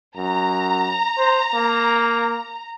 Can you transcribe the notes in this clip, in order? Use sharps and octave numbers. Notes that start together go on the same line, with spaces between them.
F#2 A#5
C5
A#3